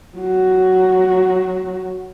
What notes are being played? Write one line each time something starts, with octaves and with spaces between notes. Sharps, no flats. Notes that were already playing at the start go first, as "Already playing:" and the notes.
F#3 F#4